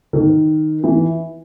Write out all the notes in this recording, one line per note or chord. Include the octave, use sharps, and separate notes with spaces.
D#3
E3